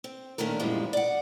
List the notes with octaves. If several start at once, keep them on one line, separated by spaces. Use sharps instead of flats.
C4
A#2 D#3 A3 C#4 D4 A#4
F#2 A#2 E3 F3 G3 G#3
D5 F#5